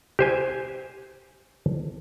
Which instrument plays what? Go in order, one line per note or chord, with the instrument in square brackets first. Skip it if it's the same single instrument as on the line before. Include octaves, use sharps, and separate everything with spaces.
[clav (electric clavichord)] G4 C5 G#5